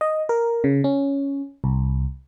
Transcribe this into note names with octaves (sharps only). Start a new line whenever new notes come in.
D#5
A#4
C#3
C#4
C2